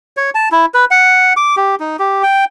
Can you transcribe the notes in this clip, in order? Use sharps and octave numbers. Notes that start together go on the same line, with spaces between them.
C#5
A5
E4
B4
F#5
D6
G4
D#4
G4
G5